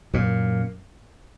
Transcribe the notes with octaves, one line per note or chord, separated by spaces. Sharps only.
F#2 A#2